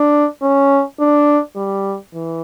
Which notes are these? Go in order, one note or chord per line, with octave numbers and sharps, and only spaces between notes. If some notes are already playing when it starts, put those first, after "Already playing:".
Already playing: D4
C#4
D4
G3
E3